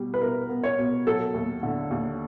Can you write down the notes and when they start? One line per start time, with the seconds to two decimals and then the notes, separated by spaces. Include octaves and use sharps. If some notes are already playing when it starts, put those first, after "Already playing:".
Already playing: B2 G3
0.14 B4
0.22 B2 A#4
0.49 B3
0.63 C#5
0.78 B2
1.07 F#3 A4
1.34 D#2
1.63 D3
1.91 D#2